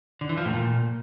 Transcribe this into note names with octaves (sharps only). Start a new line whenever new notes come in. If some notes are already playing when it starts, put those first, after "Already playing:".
D3
E3
F3
A2
A#2